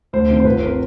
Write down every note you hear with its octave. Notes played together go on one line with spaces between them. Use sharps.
D2 C5
C3 D#3
C5
G1 B4
C3 A#4